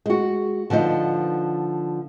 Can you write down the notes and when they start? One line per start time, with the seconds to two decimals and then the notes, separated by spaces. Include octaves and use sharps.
0.06 G#3 F#4
0.70 D3 F3 B3 D4 D#4